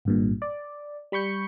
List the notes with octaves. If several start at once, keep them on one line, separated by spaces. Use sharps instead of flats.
G#1 G2 A#2
D5
G3 B5 C#6 G6 C#7